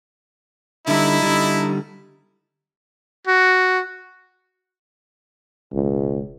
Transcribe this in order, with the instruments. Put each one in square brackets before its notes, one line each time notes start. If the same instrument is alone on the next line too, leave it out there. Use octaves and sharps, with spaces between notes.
[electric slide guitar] D3 G3 [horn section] D#4 E4
[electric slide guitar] D3 G3
[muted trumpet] F#4
[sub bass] E1 [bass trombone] C#2